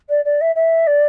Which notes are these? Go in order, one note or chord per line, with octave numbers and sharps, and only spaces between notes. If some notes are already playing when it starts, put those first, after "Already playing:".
D5
D5
E5
E5
D5